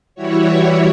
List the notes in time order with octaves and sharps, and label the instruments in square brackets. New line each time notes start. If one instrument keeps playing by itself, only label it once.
[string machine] E3 G3 E4 F#4 C#5